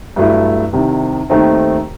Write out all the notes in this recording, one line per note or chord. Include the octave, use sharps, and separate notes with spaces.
G2 F#3 A3 E4
C2 C3 D#3
D#2 D#3 A3 C4 D#4